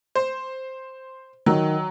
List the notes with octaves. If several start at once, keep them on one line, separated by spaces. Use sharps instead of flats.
C5
D#3 F#3